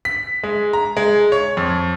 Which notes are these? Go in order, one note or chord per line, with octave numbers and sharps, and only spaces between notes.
B6
G#3
A#5
G#3
C#5
F2